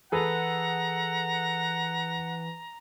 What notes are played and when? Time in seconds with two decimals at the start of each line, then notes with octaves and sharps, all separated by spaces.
0.12 E3 G#4 A4 B4 F#5 A#5